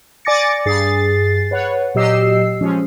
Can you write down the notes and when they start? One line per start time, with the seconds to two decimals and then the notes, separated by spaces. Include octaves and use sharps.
0.25 D5 G#5 D6 A6 A#6 C#7
0.66 G2 G#4 A6 C7
1.51 B4 C#5 F#5
1.95 A#2 F#3 G4 D#5 E6 C7
2.61 F3 G#3 C#4